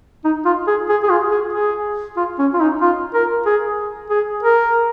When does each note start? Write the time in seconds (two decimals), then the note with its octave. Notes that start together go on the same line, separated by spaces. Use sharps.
0.24 D#4
0.45 F4
0.67 G#4
0.89 G#4
1.03 G#4
1.10 F4
1.31 G#4
1.53 G#4
2.17 F4
2.39 C#4
2.54 F4
2.60 D#4
2.81 F4
3.14 A#4
3.46 G#4
4.10 G#4
4.43 A#4